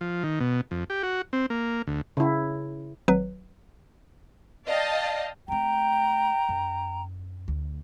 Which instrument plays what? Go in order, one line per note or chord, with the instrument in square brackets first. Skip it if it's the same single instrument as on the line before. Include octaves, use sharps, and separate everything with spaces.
[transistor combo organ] F3
D#3
B2
F2
G4
F#4
C4
A#3
D2
[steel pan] C#3 E4
[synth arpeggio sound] G#1 F#3 B4
[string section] D5 D#5 F5 G5 A5
[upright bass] A3 C4 [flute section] G5 A#5
[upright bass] F#2
D2